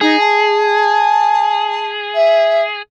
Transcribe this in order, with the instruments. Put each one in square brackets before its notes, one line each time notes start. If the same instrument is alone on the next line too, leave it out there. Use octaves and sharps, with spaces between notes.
[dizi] D#4 [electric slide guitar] G#4
[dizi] A5
E5